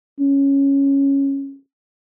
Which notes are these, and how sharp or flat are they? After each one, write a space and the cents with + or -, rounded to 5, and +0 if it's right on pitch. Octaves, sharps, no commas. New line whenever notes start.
C#4 -5